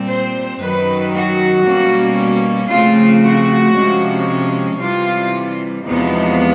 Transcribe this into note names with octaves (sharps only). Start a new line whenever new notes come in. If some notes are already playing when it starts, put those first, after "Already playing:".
Already playing: A#2 G3 C4
C5
F#2 D#3 F#3 B4
F#4
B2 G3 A#3 C#4
C#3 F3 A3 C4 F4
F#4
C3 F3 G#3 C#4
C3 E3 G3 F4
E2 C3 F3 G#3 B3 D#4